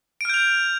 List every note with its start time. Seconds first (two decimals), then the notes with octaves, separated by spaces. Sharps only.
0.21 D7
0.25 F6
0.29 G6
0.34 F7